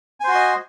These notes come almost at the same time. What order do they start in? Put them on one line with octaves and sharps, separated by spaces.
G#5 C5 F#4 C6 D#5